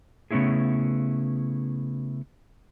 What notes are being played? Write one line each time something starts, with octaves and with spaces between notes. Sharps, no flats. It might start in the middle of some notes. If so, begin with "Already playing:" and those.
C#3 A3 B3 C#4 E4 G#4